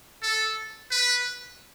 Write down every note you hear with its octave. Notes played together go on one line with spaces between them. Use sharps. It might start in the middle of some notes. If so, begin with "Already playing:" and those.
A4
B4